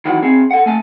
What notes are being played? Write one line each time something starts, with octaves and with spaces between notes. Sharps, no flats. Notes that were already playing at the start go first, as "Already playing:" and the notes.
D#3 E3 F#3 F#5
C4 G#4
A4 F#5
A3 G#5 A5